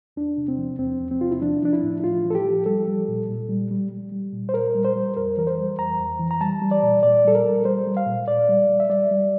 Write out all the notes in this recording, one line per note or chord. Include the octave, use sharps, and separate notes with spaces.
E2 D4
C3
C4
F3
E2 C4
E2
C4
C3 F4
E4
F3 D4
F3 D4
E4
A2
E4
A2 F4
F3
A4
G4
F3
G3 A4
G3
A#2
A#2
G3
G3
G3
G3
A#2
C5
A#2 A#4
G3
C5
G3
F2 A#4
E3 A#4
C5
G3
F2 A#5
F2
E3
A#5
G3 A5
G3
D5
A#2
A#2 D5
G3 A4
A#4
G3
G3 C5
G3
F5
A#2
A#2 D5
G3
G3
E5
G3 D5
G3